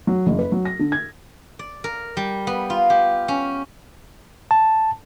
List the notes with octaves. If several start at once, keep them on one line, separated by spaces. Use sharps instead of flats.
F#3
F#1
B4
F#3
A#6
D3
G#6
D5
A#4
G3
B3
F4
G4
C#4
A5